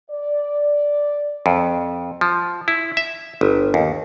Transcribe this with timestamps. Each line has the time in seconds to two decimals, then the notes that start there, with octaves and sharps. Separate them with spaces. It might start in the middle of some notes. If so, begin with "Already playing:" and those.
0.10 D5
1.46 F2
2.21 F3
2.68 E4
2.97 E5
3.41 G1
3.74 D#2